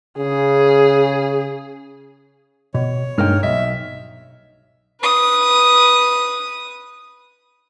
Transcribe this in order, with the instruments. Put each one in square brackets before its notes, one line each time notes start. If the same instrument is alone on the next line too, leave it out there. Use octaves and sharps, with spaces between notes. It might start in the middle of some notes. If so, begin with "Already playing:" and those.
[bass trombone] C#3 [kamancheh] G#4
[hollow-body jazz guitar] B2 [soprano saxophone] C#5
[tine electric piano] G2 D#4 F6 [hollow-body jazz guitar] G#3 A#3 G5
[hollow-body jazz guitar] B1 [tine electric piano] D#5 [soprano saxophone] E5
[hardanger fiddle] B4 D#6